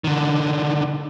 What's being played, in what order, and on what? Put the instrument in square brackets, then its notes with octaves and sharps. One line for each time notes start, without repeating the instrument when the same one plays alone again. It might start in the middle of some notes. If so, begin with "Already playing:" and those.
[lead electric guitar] D3 D#3